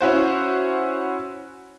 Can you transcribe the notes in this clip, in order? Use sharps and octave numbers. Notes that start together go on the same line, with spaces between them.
C#4 E4 F#4 C5